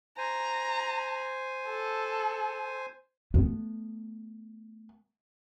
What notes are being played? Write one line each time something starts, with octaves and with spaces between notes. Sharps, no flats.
C5 G#5 A#5
A4
A3 B3